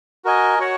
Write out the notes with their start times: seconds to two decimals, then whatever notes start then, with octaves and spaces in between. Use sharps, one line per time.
0.25 F#4 A#4 D#5 G#5
0.59 F#4 C#5 F#5